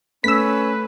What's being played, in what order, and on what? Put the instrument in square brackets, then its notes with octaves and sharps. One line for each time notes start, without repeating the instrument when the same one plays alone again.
[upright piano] A3 [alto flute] C#4 [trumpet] B4 [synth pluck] E6 B6